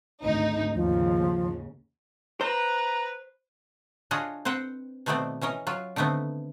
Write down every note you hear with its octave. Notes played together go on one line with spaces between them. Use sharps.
G#1 D2 D#4
D#2 G#2 C#3 F3
B4 C5 A#5
D4 F4 F#4 G#4 C#5 D#5
C4 B4 C5 F#5 G5
B2 D#3 A3 B3 C4 D5
E3 C#4 A#4 D#5
F#3 F4
D3 D#3 A3 B3 C4